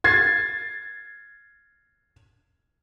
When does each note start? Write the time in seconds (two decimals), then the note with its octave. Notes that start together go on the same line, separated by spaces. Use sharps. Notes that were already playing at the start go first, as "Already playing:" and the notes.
0.04 G#6 A6 C7